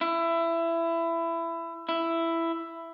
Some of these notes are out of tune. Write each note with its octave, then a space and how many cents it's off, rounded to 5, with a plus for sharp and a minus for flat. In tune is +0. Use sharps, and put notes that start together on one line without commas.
E4 +20
E4 +10